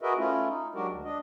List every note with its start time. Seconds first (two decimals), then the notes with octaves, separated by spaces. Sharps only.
0.01 F#4 G#4 A#4 B4 D#5 E5
0.18 A3 C#4 E4 F4
0.48 D#4
0.75 F#3 G#3 D4 F#4 G4 A#4
0.89 D2
1.04 D4 D#5